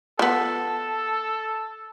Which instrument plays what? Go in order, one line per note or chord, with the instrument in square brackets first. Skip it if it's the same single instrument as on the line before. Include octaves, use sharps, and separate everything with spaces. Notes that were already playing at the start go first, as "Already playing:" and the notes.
[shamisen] F3 B3 [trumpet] A4